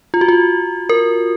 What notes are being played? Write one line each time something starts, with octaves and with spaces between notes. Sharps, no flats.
F4
F#4
F4
A#4